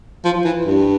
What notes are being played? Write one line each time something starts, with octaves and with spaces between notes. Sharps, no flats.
F3
E3
G2